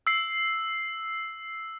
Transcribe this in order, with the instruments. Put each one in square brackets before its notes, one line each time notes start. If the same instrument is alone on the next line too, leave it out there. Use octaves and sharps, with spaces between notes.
[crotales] E6 C7